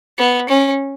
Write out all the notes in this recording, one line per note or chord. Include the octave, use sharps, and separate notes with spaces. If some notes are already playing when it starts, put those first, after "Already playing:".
B3
C#4